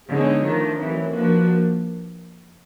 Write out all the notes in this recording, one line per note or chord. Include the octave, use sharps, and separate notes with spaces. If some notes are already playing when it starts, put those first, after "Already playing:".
D3 G#3 B3 D#4 G#4 C#5
D#3 F3 A3 D4 F4
D#3 E3 F#3 A3 C4
F3 A#3 D4 F#4 B4